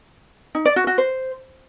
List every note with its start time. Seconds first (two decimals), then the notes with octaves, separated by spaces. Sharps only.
0.55 D#4
0.65 D5
0.76 F#4
0.87 F#4
0.98 C5